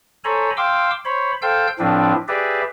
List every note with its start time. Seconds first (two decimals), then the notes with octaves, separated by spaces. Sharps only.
0.24 A4 C5 C#5 G#5 A#5 B5
0.57 F5 G5 C6 D6 E6
1.05 C5 C#5 B5
1.42 A4 C5 F5 G5 E6 G6
1.79 A2 F3 C4 D4 B4
2.28 G4 G#4 B4 D5 E5